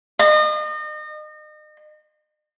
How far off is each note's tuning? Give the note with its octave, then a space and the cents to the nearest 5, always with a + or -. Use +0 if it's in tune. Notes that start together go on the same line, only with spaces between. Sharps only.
D#5 -35